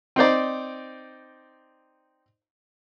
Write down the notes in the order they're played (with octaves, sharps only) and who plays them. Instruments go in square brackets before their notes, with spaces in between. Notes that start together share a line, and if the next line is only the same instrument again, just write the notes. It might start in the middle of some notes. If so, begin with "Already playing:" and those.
[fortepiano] C4 D#4 C5 D5